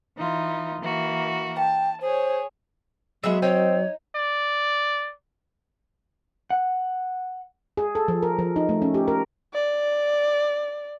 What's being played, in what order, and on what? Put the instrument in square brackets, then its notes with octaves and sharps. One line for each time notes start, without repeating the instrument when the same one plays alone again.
[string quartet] E3 D#4 F4
E3 A#3 F#4
[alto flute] G5 [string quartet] A5
[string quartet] G#4 C#5 [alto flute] C5
[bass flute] F#3 [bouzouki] G#3 B3 E5 [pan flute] G#4
[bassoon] C4 [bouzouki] D#4 [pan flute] C#5
[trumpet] D5
[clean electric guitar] F#5
[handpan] G#4
A4
F3
A#4
F3
D#4
A3
C#4
G4
A#4
[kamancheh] D5